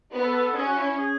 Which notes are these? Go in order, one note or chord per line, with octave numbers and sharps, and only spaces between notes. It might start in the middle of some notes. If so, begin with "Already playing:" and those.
B3
A4
A4
A4
C#4 G#4
F#4
E4
G#4